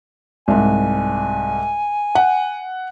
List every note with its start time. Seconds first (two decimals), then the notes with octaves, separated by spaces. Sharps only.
0.48 C2 G#2 G#5
2.15 F#5